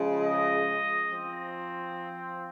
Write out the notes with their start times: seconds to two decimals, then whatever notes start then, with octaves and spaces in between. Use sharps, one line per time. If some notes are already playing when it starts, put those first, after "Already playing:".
Already playing: C#3 F3 G#3
0.24 D#5
1.11 F3 C4